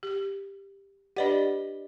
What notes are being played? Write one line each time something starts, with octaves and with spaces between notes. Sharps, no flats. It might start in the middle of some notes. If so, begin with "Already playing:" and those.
G4
D4 G4 B4 D5 D#5 F#5